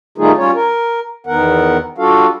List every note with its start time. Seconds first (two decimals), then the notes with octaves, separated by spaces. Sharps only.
0.18 D#3 G3 A3 D#4 F4 G#4
0.37 G3 C#4 F4 C#5
0.55 A#4
1.27 E2 D#3 B3 A#4 F#5
1.98 G3 D4 F4 F#4 A4 F5